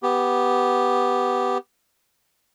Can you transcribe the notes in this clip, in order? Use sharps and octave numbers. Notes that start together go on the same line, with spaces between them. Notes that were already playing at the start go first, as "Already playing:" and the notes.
B3 G4